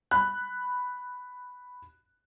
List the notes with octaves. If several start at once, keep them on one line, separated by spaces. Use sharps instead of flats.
B5 F#6